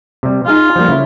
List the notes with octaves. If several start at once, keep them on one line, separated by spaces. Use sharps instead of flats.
C3 G3
D#4 F4 G#4 F5
F3 G3 A#3
C#3 E4